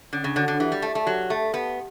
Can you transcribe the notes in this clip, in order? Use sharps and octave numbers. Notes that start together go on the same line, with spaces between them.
D3 C#4
C#3
D3 F#4 A4 C#5 F#5
D3
E3 G4
G3
A3 D5 A5
A3
F#3 G4
A3 D5 A5
B3 G4